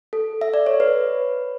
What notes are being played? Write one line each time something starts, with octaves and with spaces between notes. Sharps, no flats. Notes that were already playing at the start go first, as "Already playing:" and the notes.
A4
E5
D5
C#5
B4